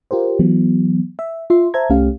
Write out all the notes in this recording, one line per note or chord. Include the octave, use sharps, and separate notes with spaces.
F4 G4 A#4 C5
E3 F#3 B3
E5
F4 E5 C6
C5 E5 A5 A#5 G#6
C2 A3 C#4 G4 F5